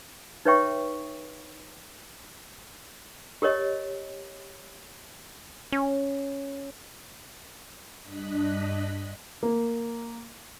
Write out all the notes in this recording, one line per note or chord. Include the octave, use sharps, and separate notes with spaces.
D#4 B4 C#5 E5 G5 C#6
G4 A#4 C#5 D#5
C#4
G2 D4 D#5 F#6 B6
A#3